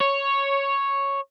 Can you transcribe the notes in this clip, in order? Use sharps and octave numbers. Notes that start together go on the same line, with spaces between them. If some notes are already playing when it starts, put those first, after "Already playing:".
C#5